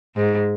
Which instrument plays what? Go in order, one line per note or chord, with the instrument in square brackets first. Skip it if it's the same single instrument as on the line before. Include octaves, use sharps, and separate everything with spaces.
[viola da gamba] G#2